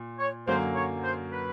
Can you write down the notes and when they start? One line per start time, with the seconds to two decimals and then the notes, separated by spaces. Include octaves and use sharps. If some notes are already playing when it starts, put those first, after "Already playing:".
Already playing: A#2
0.19 C#5
0.47 F#2 D3 F#3 A#3 C5
0.75 C#5
1.03 C5
1.32 B4